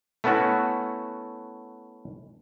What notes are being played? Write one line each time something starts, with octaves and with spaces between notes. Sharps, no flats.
A3 B3 C#4 E4 F#4